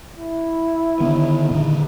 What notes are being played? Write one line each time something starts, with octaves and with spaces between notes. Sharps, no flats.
E4
D3 D#3 B3
A#2 D3